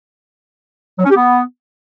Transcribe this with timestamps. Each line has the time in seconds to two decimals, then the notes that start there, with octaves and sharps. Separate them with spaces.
0.99 F#3
1.05 C#4
1.10 G4
1.16 B3